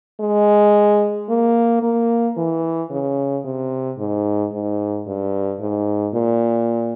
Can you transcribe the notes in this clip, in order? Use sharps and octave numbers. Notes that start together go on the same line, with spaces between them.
G#3
A#3
A#3
E3
C#3
C3
G#2
G#2
G2
G#2
A#2